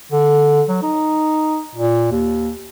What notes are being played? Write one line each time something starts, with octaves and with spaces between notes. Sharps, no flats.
D3
F#3
D#4
A#2
D#2